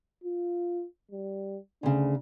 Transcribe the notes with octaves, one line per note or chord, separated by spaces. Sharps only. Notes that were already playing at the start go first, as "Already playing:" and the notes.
F4
G3
D2 C#3 D4